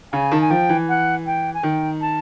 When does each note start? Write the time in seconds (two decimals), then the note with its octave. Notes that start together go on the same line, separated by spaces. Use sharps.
0.12 C#3 G#5
0.31 D#3 A5
0.41 G#5
0.50 F3 G5
0.69 E3
0.89 F#5
1.26 G5
1.54 G#5
1.63 D#3 G5
2.01 A5